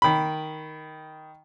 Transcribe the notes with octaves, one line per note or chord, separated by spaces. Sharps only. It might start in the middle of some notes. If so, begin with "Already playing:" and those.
D#3 B5